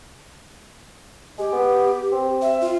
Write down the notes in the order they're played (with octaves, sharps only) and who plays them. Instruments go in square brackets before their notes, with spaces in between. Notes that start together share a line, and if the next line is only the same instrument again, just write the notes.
[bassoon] G#3 [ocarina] G4
[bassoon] B3
C4
[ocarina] E5
F4